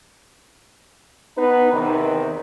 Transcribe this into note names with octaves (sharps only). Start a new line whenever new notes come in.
B3 D#4 B4
E2 C3 D#3